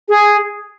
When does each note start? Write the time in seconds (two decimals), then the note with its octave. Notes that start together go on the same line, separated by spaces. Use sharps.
0.08 G#4